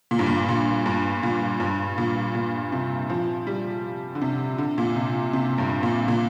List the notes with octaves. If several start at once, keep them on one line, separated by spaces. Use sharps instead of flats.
A#2
G2
A#2
A#2
G2
A#2
G2
A#2
A#2
C3
F3
G3
D3
C3
D3
A#2
C3
C3
G2
A#2
A#2